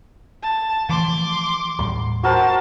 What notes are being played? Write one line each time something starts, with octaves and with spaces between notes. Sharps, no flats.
A5
E3 F3 A3 C6 D6
D#2 A2 G3 C6
F#4 A#4 C5 A5